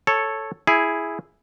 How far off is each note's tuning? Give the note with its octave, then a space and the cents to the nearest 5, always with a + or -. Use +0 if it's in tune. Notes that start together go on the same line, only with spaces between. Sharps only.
A4 +0 C#5 -5
E4 +0 G#4 +0